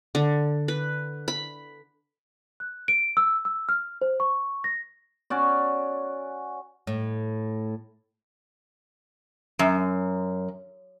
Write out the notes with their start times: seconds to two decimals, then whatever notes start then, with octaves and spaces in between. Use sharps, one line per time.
0.15 D3
0.68 B4
1.28 B5
2.60 F#6
2.88 D7
3.17 E6
3.45 E6
3.69 F6
4.01 C5
4.20 C#6
4.64 A#6
5.30 C#4 F#4 D5
6.87 A2
9.59 F#2